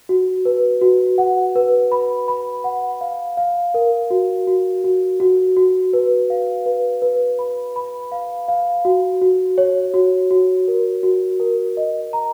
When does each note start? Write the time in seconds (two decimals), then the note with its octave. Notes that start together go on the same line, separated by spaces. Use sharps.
0.09 F#4
0.45 B4
0.81 F#4
1.18 F#5
1.56 B4
1.92 B5
2.28 B5
2.64 F#5
3.01 F5
3.37 F5
3.74 A#4
4.11 F#4
4.47 F#4
4.84 F#4
5.20 F#4
5.57 F#4
5.93 B4
6.30 F5
6.66 B4
7.02 B4
7.39 B5
7.76 B5
8.12 F5
8.48 F5
8.85 F#4
9.22 F#4
9.58 C#5
9.94 F#4
10.31 F#4
10.68 A#4
11.03 F#4
11.40 A#4
11.77 D#5
12.13 A#5